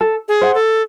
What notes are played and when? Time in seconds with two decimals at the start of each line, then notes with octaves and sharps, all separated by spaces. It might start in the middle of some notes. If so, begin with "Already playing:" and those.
0.01 A4
0.28 G#4
0.42 C5 F#5
0.54 A4